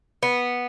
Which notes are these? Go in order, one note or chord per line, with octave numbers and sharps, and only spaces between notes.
B3